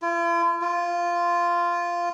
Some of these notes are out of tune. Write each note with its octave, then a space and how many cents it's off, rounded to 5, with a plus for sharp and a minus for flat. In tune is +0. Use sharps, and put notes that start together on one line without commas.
F4 -45
F4 -10